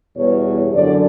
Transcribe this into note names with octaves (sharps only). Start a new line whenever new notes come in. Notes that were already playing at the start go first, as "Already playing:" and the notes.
E2 B2 G3 C#5
F#2 D3 F#3 D5